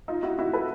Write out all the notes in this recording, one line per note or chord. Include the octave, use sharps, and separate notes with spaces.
D#4 F4
E4 F#4
E4 F#4
A4 B4